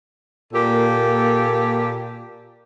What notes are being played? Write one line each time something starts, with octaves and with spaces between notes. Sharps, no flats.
A#2 A#3 G4 A4